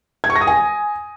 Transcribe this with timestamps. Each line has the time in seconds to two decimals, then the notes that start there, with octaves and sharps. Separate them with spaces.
0.24 G#6
0.30 C#6
0.36 A#6
0.41 D#6
0.47 G#5